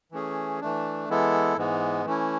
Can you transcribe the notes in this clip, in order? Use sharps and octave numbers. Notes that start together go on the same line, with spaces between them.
E3 A3 C#4 G#4
E3 A3 D4
E3 G#3 B3 E4 A4
G#2 E3 G#3 B3
E3 A3 C#4 E4